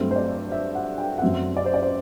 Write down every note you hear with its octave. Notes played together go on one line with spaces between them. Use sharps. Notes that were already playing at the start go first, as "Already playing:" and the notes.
Already playing: G2 F#3 A3 C4
C5
D5
E5
F#5
G5
F#5
F#2 F#3 C4 E5
D5
C5
D5
C5